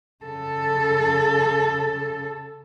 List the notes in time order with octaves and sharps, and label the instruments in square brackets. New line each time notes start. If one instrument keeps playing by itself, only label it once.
[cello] C#3 A4